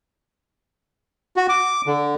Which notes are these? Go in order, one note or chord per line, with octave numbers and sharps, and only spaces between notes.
F#4
D6
D3